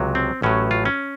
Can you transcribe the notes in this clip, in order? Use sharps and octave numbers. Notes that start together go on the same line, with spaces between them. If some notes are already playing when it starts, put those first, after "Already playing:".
Already playing: C#2 C3 F#3
C4
A1 A2 F#3 C#4
F4
C#4